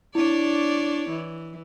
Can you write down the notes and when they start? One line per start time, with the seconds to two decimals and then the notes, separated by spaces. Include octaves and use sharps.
0.15 D4 E4 C#5 D5
1.10 E3